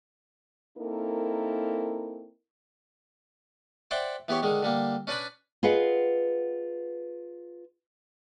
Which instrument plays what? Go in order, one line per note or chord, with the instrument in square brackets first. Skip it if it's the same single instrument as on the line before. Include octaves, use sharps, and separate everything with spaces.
[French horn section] A#3 C4 D#4 E4 A4 A#4
[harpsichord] C5 D5 E5 F#5 G5
E3 B3 G4 C#5
D3 D#3 G#3
D3 G3 A#3
C#4 D4 B4 D5 G#5 B5
[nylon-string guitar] F4 G#4 B4 D#5 F#5